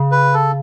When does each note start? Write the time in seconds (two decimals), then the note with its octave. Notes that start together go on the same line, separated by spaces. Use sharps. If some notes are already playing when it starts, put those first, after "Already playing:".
Already playing: C#3
0.12 B4
0.34 A4